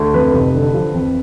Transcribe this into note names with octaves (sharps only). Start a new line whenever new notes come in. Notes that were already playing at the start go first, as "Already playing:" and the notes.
Already playing: D2
F2 B4
F1
D3
F3
F2